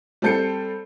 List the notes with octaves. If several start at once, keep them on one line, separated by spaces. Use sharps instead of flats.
G3 C4 A4 G6 C7 C#7